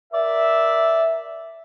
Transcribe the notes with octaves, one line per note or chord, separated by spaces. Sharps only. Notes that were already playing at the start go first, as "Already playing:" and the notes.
A#4 D5 E5